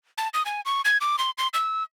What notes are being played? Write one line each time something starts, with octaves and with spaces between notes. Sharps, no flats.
A5
D#6
G#5
C#6
G#6
D6
C6
C6
E6